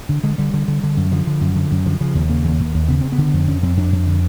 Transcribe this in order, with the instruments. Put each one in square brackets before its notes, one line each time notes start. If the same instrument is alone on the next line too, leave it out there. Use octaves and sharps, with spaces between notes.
[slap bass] D3
D3 G#3
D3 G3
D3
D3
D3
F#2
D3 F3
D3
F#2
D3
F#2
D3 F3
C#3 F3
D#2
C#3 A#3
D#2
D#2
D#2
C#3 B3
C#3 C4
B3
D3
F2
F2 C#4
F2 C4
F2 D4
F2
D3